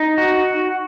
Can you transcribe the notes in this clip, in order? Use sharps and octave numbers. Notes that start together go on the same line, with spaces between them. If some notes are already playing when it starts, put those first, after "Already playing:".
Already playing: D#4
F#4